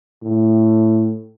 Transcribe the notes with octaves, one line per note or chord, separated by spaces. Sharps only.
A2